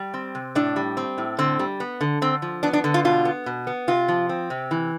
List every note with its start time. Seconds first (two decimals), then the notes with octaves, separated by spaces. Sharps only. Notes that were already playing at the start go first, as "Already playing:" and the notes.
Already playing: G3
0.14 C4
0.35 C3
0.55 A2 D4
0.76 G3
0.97 C4
1.18 A2
1.38 D3 C4
1.59 G3
1.80 B3
2.01 D3
2.22 D3 C4
2.42 F3
2.63 B3 D4
2.73 D4
2.84 D3
2.94 F4
3.05 B2 F4
3.25 B3
3.46 B2
3.67 B3
3.88 C3 F4
4.08 F3
4.29 C4
4.50 C3
4.71 E3